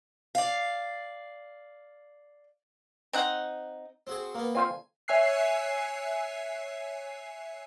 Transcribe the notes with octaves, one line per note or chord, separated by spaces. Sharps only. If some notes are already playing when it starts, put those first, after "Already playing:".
D5 F5
C4 D#4 F#5
C4 F#4 G#4
A#3 B3
C4 F4 C5 G#5
C#5 E5 G#5 E6 F#6 C7